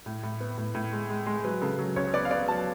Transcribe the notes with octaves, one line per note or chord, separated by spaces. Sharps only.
A2
A2
B3
A2
A2
G#3
G#3
G#3
F#3 B4
C#3 A4
F#3
C#2 C#5
B3 D5
F5
B3 D5
F#3 A5